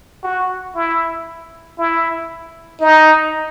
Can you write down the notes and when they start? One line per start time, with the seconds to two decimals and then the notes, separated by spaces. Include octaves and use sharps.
0.24 F#4
0.75 E4
1.78 E4
2.81 D#4